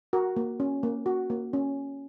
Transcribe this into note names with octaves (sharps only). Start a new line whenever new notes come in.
F#4 A#4
A#3
C#4
A#3
F#4
A#3
C#4